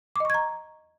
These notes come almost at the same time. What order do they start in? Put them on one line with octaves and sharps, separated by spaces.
D6 D#5 C#6 G#6 A#5